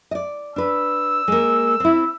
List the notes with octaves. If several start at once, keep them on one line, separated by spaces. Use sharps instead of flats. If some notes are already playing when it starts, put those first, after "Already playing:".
D5 D#5
D4 B4 E6
G#3 A#3
C4 E4